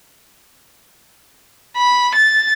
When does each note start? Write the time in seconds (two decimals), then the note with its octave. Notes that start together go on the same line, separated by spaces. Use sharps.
1.78 B5
2.15 A6